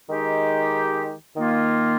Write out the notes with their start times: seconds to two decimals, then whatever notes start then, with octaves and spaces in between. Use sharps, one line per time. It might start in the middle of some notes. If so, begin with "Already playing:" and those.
0.10 D#3 G#3 D#4 G4
1.37 D#3 A#3 F4